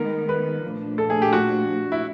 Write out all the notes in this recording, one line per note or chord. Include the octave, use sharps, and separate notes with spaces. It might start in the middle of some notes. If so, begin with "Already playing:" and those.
Already playing: D#3 G#3 B3 A#4
B4
A#2 F3 A3 D4
A4
G#4
G4
F#4
E4